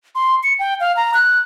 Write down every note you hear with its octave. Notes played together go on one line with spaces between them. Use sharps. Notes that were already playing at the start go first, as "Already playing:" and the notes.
C6
C#7
G5
F5
A#5
F#6